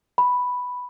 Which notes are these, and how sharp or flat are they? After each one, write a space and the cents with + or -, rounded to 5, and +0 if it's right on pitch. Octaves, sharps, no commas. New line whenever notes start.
B5 +0